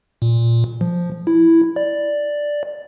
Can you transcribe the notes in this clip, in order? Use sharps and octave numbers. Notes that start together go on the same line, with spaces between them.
A#2
F3
E4
D5